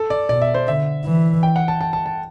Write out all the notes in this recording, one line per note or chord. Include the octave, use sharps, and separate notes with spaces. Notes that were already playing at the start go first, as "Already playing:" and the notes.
Already playing: A4
D5
B2 D5
E5
C5
D3 E5
E3
G5
F#5
A5
A5
A5
A5